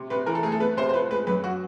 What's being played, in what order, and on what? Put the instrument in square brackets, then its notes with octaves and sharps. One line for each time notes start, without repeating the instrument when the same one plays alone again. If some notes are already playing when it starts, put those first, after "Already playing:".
Already playing: [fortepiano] C3
[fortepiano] C3 [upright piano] B4
[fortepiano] E3 [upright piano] A#4
[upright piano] A4
[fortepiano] A3 [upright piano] G#4
[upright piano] A4
[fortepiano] B3 [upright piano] B4
[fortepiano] C3 [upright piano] C5
[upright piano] C5
[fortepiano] F3 [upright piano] B4
[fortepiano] G#3 [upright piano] B4
[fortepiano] F#2 [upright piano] B4
[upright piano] F#4